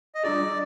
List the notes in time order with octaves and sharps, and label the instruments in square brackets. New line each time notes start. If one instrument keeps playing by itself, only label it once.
[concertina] D#5
[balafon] G3 D4 F4 G#4 [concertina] D5